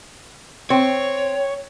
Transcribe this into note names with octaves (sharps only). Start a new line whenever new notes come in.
C4 C#5